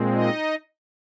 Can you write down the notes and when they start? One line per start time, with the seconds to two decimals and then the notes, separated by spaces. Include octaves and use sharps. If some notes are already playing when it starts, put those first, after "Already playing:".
Already playing: A#2 G#3 C4
0.13 D#4 D#5